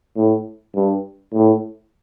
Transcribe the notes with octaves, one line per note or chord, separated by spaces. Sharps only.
A2
G2
A2